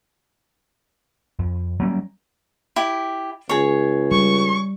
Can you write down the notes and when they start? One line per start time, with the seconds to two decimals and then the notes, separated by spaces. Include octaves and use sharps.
1.39 F2
1.80 F#3 G3 A#3 C#4
2.76 E4 G4
3.49 C#2 G#4 C#5
4.12 G3 C#6